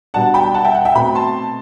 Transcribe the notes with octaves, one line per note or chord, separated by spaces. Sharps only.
B2 G3 D4 F#5 A5
G5 B5
F#5 A5
E5 G5
F#5
E5 G5
B2 A3 C4 G5 B5
A5 C6